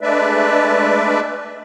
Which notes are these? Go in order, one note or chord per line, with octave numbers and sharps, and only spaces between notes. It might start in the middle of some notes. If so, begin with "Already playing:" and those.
G#3 A3 D4 B4 D5 E5